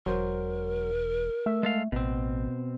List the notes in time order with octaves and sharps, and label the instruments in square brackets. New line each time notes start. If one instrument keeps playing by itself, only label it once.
[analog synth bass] E1 [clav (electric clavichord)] F#3 C5 [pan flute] A#4
[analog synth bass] A3 [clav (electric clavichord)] E5
[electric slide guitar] G#3 A4 F5
[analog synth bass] A1 [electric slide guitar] B2 C4